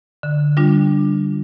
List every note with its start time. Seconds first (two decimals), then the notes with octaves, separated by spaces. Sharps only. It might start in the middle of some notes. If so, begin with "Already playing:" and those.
0.23 D3
0.57 G3 D4 F4